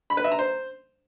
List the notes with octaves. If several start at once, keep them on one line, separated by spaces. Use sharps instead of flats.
B5
B4
E5
A#5
C5